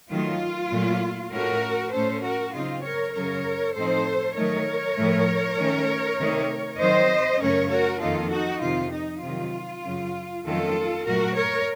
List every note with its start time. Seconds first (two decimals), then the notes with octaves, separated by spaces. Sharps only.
0.11 D#3 F#3 A3 F4
0.72 A#2 F#3 A3
1.32 A2 A3 C#4 F#4 A#4
1.93 A2 A3 C#4 A4 C5
2.24 F#4 A#4
2.54 C#3 F#3 C4 D#4 F4
2.84 A#4 C#5
3.15 F#2 C#3 F#3 A#4 C#5
3.75 A2 F3 C4 D#4 A4 C5
4.36 D#3 F#3 A3 D#4 A#4 C#5
4.97 A2 F3 A3
5.58 D#3 A3 C#4
6.20 C3 D#3 A3 D#4
6.79 D#3 F#3 C4 C5 D#5
7.41 F#2 C#3 A3 C#4 A#4 C#5
7.71 F#4 A#4
8.01 F2 D#3 A#3 D#4 F4 A4
8.31 D#4 F#4
8.62 F2 C3 D#3 F4
8.92 D#4
9.23 C3 D#3 F#3 F4
9.84 F#2 C#3 F#3
10.45 F2 D#3 F#3 A3 C#4 F4 A4
11.06 A#2 F#3 A3 F#4 A#4
11.36 A#4 C#5